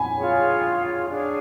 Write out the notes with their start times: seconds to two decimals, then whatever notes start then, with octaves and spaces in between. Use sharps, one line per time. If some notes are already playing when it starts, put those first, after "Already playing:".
Already playing: G#5 B5
0.17 F4 G#4 C#5
1.09 D4 G#4 C#5 F5